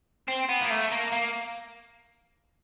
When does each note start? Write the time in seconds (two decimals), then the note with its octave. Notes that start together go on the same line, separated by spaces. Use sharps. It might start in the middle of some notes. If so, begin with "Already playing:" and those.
0.28 C4
0.49 B3
0.61 A#3
0.70 A3
0.92 A#3
1.12 A#3